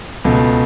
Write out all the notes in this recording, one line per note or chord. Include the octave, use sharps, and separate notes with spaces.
C#2 B2 A3